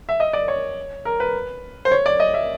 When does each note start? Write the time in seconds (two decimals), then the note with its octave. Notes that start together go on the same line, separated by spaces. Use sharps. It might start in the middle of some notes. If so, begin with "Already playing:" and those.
0.09 E5
0.20 D#5
0.33 D5
0.48 C#5
1.05 A#4
1.20 B4
1.85 C5
1.91 C#5
2.06 D5
2.20 D#5
2.34 E5